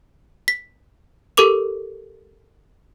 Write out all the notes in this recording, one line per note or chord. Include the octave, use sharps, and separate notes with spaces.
B6
G4 A4 A#4 D6 F7